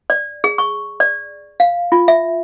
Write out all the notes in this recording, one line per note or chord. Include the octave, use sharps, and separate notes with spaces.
D5
G#4
C#6
D5
F5
F4
E5